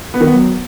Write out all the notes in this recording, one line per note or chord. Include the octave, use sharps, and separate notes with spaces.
B3
D#3
B3
F#3